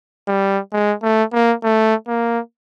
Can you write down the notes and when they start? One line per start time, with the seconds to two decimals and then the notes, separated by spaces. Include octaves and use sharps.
0.28 G3
0.73 G#3
1.03 A3
1.33 A#3
1.63 A3
2.08 A#3